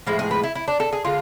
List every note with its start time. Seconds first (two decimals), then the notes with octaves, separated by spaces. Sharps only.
0.07 A2 F3 G#3 E4
0.19 G#4
0.31 B4
0.43 E4
0.55 E4
0.68 D4
0.80 A4
0.93 G#4
1.05 D3 G#3 F4